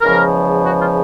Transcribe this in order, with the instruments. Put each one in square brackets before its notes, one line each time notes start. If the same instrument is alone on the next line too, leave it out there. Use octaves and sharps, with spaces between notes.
[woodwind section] E2 C#3 F3 G#3 A#4
F#4
F4